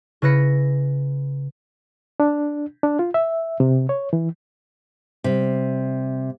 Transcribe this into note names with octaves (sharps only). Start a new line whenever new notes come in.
C#3 E4 B4 A#6 C#7
D4
D4
F4
E5
C3
C#5
E3
C3 G3